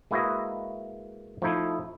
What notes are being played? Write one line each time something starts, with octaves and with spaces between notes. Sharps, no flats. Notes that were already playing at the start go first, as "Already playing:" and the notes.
G#3 A#3 E4 F#4 B4 D#5
F3 A3 D#4 E4